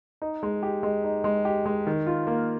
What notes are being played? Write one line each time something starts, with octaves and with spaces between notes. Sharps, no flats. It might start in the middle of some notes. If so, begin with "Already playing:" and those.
D#4
G#3
G4
G#3
D#4
G#3
G4
G#3
D#3
F4
A#3